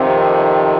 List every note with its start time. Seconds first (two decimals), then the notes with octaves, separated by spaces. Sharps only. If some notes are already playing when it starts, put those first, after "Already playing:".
Already playing: F2 C3 D#3